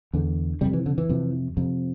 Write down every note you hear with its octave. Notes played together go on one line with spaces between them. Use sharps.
E2 D3
F2 C3 G3
E3
D3
E3
F2 C3
F2 C3